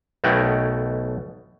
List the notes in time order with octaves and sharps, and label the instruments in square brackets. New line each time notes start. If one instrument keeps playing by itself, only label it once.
[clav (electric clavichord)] B1 B2 A3 A#4 F#5 G5